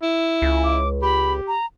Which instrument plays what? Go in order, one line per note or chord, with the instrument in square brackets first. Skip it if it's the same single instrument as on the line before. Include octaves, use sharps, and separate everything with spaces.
[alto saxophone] E4
[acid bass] C#2
[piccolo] D6
[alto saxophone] G4 [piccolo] B5
[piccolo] A#5